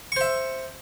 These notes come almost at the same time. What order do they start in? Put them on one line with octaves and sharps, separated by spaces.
C#6 C5 E5